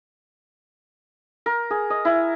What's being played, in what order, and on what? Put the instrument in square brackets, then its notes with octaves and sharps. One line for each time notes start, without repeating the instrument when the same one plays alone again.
[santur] A#4
G#4
D#5
E4